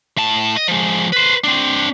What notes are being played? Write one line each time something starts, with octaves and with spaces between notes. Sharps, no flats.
A2 A5
D#5
F3 G#3
B4 C5
C4 D4